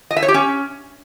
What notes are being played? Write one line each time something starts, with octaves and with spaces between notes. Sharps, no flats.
D#5
E5
C#5
G4
C#4